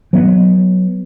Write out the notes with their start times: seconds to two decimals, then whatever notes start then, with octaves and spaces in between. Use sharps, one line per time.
0.13 F#3 B3